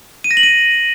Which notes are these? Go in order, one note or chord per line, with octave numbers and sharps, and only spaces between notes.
D#7
A#6
F#7
D#7